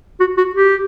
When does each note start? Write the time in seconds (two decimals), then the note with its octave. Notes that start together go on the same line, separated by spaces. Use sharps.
0.20 F#4
0.37 F#4
0.55 G4